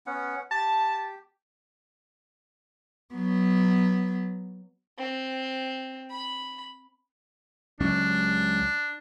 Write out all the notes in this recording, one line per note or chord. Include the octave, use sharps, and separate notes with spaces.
B3 C#4 F#5
G4 A5
F#3 B3
C4
B5
C#2 F#3 C#4 D4